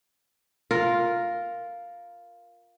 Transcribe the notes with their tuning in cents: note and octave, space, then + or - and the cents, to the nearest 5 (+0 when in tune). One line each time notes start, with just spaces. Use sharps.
F4 +0 A#4 +0